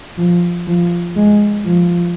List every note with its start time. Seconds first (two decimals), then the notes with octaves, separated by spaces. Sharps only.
0.18 F3
0.67 F3
1.16 G#3
1.65 F3